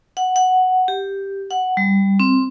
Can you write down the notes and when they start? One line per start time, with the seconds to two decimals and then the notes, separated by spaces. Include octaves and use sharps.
0.17 F#5
0.36 F#5
0.88 G4
1.51 F#5
1.77 G3
2.20 C4